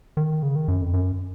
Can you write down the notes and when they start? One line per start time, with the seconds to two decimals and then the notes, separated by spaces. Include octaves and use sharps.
0.17 D#3
0.43 C#3
0.56 D#3
0.68 F#2
0.82 F2
0.94 F#2